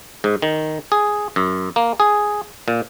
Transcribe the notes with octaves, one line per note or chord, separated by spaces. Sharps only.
G#2
D#3
G#4
F#2
A#3
G#4
A#2